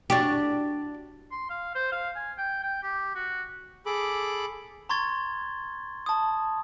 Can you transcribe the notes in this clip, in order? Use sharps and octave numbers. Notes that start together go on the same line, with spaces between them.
D4 F#4 G4
C6
F5
C5
F5
G#5
G5
G5
G4
F#4
G#4 A4 B5 D6
A#5 C6 C#6 G#6 A6 G7
A5 D#6